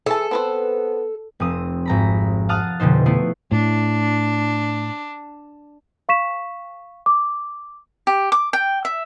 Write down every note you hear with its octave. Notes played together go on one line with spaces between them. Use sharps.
E3 G#4 A4 A5
B3 C4 B4 C5
F1 C4 D#6
G#1 A#5 B5
F5 F#5 A5 D#6 F6
F1 B2 D3 D#4 C5
A3 B3 E4 C7
A2 D4
F5 C#6 B6 E7
D6
G4
D6
G5
E5